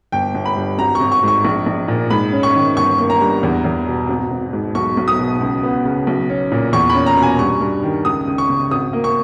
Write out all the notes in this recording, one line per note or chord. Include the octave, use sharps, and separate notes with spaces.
G1 G5
G1
B5
G2
G#1 A#5
C#6
G#1
C#6
G#2 C#6
A#1
A#1
A#2
G#2 B5
C#4
C#6
D#3
G1 C#6
A#3
A#5
G2
E2
E2
B2
G#1
G#1
G#2
B1 C#6
B1
D#6
B2
C#2
B3
C#3
B1
C#4
A#2
E2 C#6
B5
C#4
A#5
B2
G#5
G2 C#6
G2
D#3
C#2 D#6
C#2
C#6
C#3
G#1 D#6
A#3
C#6